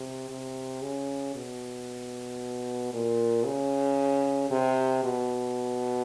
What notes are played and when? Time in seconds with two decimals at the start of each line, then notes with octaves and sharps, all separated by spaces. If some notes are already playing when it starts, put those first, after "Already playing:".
Already playing: C3
0.30 C3
0.82 C#3
1.36 B2
2.93 A#2
3.45 C#3
4.51 C3
5.04 B2